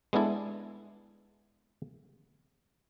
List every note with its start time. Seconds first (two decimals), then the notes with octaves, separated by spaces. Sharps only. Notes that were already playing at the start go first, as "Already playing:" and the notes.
0.13 G#3 B3 D4 E4 A4